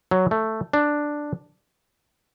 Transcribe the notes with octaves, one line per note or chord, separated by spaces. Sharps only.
F#3
A3
D4